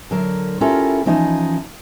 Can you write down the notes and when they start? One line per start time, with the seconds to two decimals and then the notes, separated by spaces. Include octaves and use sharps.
0.11 D3 F#3 A#4
0.61 C#4 E4 F4 G4 A4 A#4
1.06 E3 F3 C#4 D#4 D#5